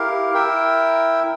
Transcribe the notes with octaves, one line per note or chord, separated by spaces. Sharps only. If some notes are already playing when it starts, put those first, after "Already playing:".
Already playing: E4 G4 A#4 F5
E4 A#4 E5 G5